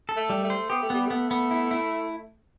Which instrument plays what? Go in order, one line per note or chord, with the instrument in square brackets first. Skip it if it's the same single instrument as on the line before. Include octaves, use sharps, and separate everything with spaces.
[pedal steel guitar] A4
[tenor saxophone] A3
[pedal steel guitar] G3
[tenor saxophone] A3
[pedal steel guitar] C5
[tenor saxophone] B3 [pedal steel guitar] G4
[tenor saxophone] A3
[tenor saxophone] G3 [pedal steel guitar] B3
[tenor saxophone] A3 [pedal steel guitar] B3
[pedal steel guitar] B3
E4
E4